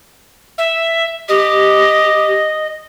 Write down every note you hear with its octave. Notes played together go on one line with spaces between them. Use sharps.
E5
G4 D#5